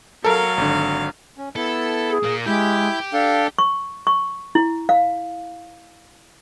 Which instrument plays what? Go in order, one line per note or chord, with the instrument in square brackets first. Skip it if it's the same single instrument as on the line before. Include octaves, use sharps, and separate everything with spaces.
[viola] F#3 F5 [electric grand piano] A4 A#4
[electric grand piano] G#1 D3
[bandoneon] C#4
[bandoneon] B3 E4 [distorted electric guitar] A4
[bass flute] G#4
[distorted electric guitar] A#2 A#3
[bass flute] G#3 [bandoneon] E4 G6 [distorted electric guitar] G4
[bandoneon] D4 A4 [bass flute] F5
[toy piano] C#6
C#6
E4
F5